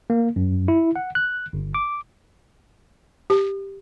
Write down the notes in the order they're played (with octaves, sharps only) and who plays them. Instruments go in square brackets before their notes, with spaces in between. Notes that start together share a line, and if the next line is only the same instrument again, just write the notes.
[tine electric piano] A#3
F#2
E4
F#5
F#6
G1
D6
[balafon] G4